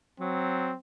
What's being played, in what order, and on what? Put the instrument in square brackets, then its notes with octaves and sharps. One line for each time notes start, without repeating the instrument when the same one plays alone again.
[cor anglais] F#3 [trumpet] C4